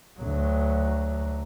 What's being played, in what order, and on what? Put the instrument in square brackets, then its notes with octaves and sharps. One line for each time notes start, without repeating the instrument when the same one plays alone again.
[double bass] D2 F#3